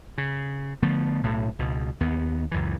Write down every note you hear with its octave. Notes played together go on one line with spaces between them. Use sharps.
C#3
D3 F3 A3 B3
B1 A2
C#2 B2
D#2 B3
C#2 F#2 E3